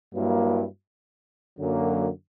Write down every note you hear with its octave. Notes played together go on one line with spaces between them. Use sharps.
G2 F#3 A#3 E4
F#2 D3 F#3 A#3